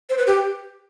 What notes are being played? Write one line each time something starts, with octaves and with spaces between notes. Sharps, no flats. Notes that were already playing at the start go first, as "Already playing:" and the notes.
C5
B4
G4